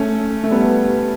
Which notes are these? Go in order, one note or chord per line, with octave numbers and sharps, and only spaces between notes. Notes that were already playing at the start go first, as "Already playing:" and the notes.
Already playing: A3 C#4
A3
G3 B3